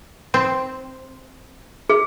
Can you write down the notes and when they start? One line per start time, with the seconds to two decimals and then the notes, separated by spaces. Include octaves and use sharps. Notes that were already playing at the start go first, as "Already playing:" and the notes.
0.34 C4
1.90 G#4